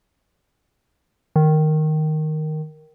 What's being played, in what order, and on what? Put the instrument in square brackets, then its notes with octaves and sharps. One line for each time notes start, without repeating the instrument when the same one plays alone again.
[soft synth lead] D#3